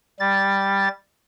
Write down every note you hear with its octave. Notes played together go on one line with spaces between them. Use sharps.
G3 A6